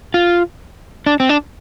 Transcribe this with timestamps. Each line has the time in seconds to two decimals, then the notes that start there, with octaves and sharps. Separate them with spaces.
0.14 F4
1.06 D4
1.20 C4
1.29 D4